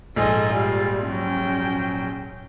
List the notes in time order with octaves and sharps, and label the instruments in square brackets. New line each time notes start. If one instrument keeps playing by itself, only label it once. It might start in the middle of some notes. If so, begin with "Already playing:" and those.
[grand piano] A#1 G#2 [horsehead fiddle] A4 G#5 [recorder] D#5
[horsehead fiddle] G3 [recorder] F4
[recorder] F#3 [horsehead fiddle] C#4 G5